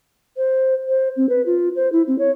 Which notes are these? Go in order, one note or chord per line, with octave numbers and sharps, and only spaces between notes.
C5
C5
C4
B4
F4
C5
E4
C4
C#5